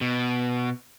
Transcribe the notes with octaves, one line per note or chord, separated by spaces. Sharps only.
B2